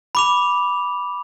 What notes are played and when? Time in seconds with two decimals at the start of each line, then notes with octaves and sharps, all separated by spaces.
0.15 B5 D6 F7